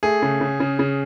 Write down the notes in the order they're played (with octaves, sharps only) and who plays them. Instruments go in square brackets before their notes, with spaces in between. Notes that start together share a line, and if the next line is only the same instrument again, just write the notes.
[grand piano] A3 G#4
C#3
C#3
C#3
C#3